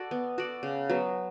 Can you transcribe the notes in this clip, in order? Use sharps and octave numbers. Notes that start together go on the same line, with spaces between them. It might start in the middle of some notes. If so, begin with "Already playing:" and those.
Already playing: F#4 A4 D5
B3
F#4 A4 D5
C#3
F#3 B3